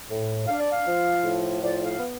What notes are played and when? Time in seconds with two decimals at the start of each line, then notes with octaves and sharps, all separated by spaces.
0.10 A2
0.47 D4 F5
0.59 D5
0.71 F5
0.86 F3
1.23 A2
1.61 F3 D5
1.85 F5
1.98 B3